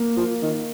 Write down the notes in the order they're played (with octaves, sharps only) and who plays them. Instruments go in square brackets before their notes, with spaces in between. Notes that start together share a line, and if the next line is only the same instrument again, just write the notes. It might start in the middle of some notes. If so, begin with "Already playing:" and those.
Already playing: [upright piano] A#3
[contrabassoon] F3
D#3